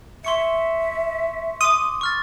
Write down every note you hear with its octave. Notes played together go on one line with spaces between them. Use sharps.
E5 C6 C#6 C#7
C6 D6 D#6
C#6 F6 A6